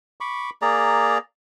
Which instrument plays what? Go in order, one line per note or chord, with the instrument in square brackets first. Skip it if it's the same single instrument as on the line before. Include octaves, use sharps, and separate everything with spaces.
[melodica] B5 C#6 D6
A#3 G#4 D5 A#5